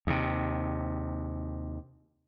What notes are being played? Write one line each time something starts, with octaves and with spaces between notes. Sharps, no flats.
D#2 C3